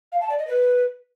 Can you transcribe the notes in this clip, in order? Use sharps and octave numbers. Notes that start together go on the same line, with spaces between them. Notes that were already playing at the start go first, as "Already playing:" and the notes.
F5
A5
D5
D#5
B4